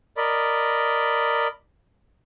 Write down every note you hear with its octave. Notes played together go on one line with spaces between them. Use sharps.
A#4 D5 D#5 B5